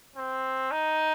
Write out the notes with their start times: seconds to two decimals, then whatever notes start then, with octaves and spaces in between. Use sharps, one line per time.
0.16 C4
0.71 D#4